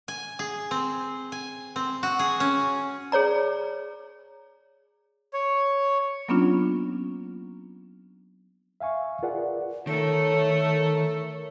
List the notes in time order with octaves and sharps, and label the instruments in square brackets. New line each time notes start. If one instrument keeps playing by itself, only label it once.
[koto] G#5
G#4
C4
G#5
C4
F#4
G#4
C#4
[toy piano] G#4 C#5 D5 A#5
[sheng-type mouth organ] C#5
[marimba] F#3 A#3 B3 C#4 D4 F4
[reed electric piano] E5 F5 G#5 C#6
F4 G#4 A#4 B4 D5 F#5
[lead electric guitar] D#3 [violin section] A3 [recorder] A4 [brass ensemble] A#4 C#5